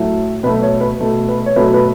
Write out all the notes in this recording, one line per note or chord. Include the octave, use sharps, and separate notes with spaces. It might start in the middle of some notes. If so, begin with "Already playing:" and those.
Already playing: A2 F#3 A3
B2 F#3 A3 B4
C#5
B4
B2 A3 A4
B4
C#5
B2 F#3 A3 B4
B4